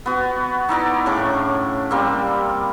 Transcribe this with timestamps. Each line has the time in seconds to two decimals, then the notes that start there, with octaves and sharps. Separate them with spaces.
0.06 B3 F#4
0.69 D#4 E4 D5 A#5
1.06 A2 C#3 D4 D6
1.91 G3 A#3 C4